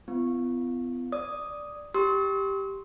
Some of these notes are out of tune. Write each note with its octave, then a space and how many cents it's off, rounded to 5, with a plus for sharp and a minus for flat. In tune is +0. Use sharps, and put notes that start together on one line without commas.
B3 +35 F4 -40
D5 +0 D#6 +0
G4 +0 C6 +0 E6 -45